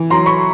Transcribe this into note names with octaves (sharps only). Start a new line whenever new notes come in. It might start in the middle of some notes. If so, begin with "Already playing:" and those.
Already playing: E3
F#3 A#5 C6
B5 C#6